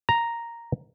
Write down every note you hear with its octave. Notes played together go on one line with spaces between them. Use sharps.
A#5